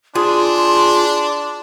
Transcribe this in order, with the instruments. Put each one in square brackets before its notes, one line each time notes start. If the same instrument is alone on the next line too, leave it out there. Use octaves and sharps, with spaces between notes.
[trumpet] D4 [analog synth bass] F4 [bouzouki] G#4 [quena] C6